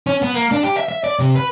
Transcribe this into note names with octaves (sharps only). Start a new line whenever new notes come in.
C#4
B3
A#3
D4
G4
E5
E5
D5
C3
B4